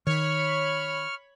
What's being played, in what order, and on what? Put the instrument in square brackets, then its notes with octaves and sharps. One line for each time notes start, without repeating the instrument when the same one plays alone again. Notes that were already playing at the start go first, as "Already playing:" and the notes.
[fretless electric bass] D#3 [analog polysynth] C#5 B5 [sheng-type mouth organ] C#6 F6